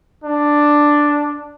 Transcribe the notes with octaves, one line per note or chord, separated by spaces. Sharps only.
D4